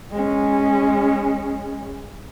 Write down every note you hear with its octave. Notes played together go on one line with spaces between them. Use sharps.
G#3 C#4